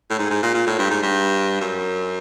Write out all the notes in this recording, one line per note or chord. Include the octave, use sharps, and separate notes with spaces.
A2
G#2
G#2
A#2
A#2
A2
G2
G#2
G2
F#2